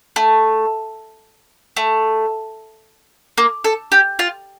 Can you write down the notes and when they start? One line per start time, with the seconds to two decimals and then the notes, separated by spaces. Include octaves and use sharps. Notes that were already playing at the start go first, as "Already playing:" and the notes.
0.16 A3
1.77 A3
3.38 A#3
3.64 A4
3.92 G4
4.19 F4